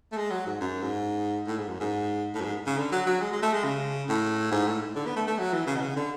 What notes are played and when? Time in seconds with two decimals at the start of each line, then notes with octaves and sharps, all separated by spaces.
0.12 A3
0.17 G#3
0.31 F#3
0.46 G#2
0.60 F#2
0.82 G#2
1.47 A2
1.58 G#2
1.69 F#2
1.80 G#2
2.34 A2
2.40 F#2
2.45 G#2
2.66 C#3
2.78 D3
2.92 F#3
3.06 F#3
3.21 G#3
3.32 G#3
3.42 A3
3.53 G#3
3.64 C#3
4.08 A2
4.51 G#2
4.66 A2
4.95 D3
5.06 B3
5.16 A3
5.27 A3
5.39 F#3
5.53 E3
5.67 C#3
5.76 B2
5.82 C#3
5.96 D3